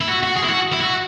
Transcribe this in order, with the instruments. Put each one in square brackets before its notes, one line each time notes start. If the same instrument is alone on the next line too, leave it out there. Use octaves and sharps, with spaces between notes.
[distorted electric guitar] E4
F#4
F#4
G#4
E4
F#4
E4
F#4